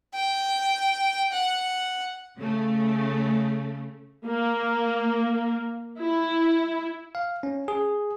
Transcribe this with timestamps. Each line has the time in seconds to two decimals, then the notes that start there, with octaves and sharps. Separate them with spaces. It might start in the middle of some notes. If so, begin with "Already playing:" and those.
0.14 G5
1.33 F#5
2.37 C#3 A3
4.24 A#3
6.00 E4
7.15 F5
7.43 C#4
7.68 G#4